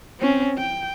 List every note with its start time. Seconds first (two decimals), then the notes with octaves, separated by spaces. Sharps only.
0.20 C4 C#4
0.58 G5